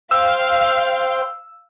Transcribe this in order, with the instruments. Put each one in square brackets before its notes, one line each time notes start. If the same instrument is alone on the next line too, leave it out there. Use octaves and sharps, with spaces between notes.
[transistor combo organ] C5 G5 [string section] F5 [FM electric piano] E6